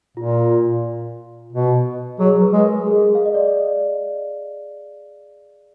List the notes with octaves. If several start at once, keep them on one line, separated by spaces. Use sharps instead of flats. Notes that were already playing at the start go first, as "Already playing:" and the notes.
A#2 F4
B2
F#3 G#4
B4
G#3
B4
A#4
G#4
F5
D#5
D5